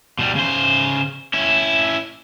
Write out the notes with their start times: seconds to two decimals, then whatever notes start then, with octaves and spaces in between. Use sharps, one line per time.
0.19 B2 G3
0.36 C#3 C5
1.33 C#4 E4